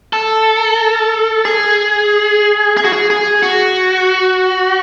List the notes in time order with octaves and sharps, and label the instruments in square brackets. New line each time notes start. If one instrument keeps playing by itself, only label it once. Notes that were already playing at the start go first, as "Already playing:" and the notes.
[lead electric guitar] A4
G#4
G#4
F#4
G#4
G#4
F#4